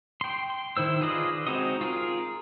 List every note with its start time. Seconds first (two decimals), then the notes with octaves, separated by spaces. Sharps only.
0.21 G5 C6
0.50 C6
0.77 D#3 E4 C5 E6
1.01 F4 G#4 B4 D5 D#5
1.47 G#3 C4 D#4 F#4 D#5
1.81 F4 G#4 A#4